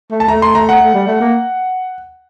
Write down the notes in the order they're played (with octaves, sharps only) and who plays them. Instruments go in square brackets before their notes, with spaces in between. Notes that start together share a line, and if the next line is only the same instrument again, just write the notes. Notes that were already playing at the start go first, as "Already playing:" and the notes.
[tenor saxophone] A3
[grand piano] A5
[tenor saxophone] A3 [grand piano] A#5
[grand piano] C6
[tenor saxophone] A3 [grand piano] A#5
[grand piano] F#5
[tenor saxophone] A3
G3
A3
A#3